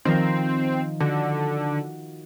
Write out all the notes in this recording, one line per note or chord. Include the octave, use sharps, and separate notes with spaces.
D#3 F3 C4 A#4
D3 F#4